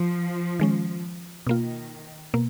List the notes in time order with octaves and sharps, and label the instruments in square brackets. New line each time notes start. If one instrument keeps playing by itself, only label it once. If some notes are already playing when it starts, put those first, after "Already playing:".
Already playing: [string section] F3
[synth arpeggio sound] D#3 G#3 C#4
[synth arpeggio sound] B2 A#3 F4 [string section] D#3
[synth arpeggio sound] B2 A#3